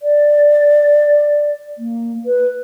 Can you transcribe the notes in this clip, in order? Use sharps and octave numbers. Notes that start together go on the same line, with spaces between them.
D5
A#3
B4